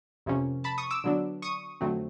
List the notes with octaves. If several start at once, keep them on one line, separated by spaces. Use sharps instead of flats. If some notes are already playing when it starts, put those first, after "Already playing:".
F2 C3 F3 A#3 C#4
A5 B5
C#6 D#6
D6 E6
D3 F#3 B3 D4
C#6 D#6
F2 D3 F#3 A3 C4